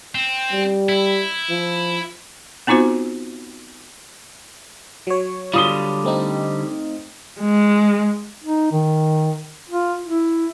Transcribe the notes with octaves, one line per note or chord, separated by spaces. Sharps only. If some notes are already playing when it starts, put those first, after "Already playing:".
C4
G3
E4
F3
B3 C4 D#4 F4 F#4 C5
F#3 C#5
D3 G3 F4 D#6 G7
A3 C4 D#4
G#3
D#4
D#3
F4
E4